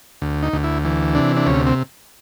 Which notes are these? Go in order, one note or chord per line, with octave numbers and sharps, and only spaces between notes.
D2
D#4
D2
E4
E3
C3 D4
D4
D2 C#4
C4